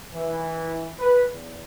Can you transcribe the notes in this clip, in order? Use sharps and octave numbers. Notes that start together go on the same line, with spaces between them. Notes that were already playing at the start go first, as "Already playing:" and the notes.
E3
B4
E2